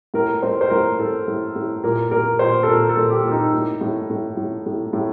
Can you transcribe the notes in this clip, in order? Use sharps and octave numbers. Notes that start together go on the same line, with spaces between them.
A2 A#4
A2 C5
C5
A2 A#4
A2 A4
A2
A2
A#2 A#4
A#2 A#4
A#2 C5
A4
A#2 A#4
A4
A#2
G4
A#2
D#4
A2
A2
A2
A2
A2
A2